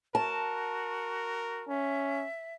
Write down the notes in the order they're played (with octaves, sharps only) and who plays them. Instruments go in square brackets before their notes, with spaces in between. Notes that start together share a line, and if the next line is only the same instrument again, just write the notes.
[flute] F#4 [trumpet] A#4 [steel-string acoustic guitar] A5
[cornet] C#4 [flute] E5